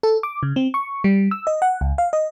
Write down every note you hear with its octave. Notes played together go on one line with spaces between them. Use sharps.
A4
D6
C#3
C4
C#6
G3
E6
D#5
F#5
C#2
F5
D#5